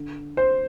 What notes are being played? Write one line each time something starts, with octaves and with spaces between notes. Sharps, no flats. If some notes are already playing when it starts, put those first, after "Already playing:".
Already playing: D3
C5